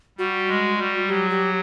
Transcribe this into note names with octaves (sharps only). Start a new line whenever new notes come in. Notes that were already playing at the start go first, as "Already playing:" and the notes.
G3 F#4
G#3
G3
F#3 G4
G4